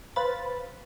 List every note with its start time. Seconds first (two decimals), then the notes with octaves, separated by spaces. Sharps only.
0.16 B4 C5 F5 B5 A6